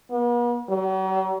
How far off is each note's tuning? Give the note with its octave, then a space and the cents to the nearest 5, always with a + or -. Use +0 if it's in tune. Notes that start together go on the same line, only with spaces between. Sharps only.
B3 -45
F#3 +45